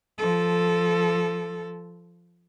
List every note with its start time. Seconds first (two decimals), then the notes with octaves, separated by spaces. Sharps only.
0.18 F3 A4